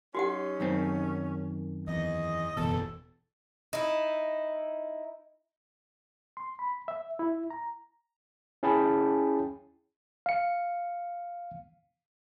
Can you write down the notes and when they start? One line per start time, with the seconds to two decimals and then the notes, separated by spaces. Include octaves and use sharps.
0.15 F#3 C#4 D#4 F#4 G4 F#5
0.60 F#2 D#3 C4
1.88 E2 D#5
2.57 F#1 E2 B2 A4
3.73 D#4 E4
6.37 C6
6.59 B5
6.88 E5
7.19 E4
7.50 A#5
8.63 C#4 E4 G#4 G5 A5 B5
10.26 F5 C#7